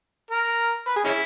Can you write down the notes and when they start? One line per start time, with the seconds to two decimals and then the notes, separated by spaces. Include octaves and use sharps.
0.31 A#4
0.87 B4
0.96 G#4
1.05 G#3 C#4 E4